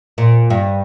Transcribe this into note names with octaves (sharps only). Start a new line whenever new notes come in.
A#2
G2